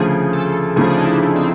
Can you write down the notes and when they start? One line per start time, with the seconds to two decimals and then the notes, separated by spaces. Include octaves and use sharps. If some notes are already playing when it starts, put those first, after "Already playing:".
Already playing: D2 C#3 F3 G#4
0.32 A4
0.76 D2 C#3 F3 G#4
0.89 D4
0.97 D#4
1.05 E4
1.35 C4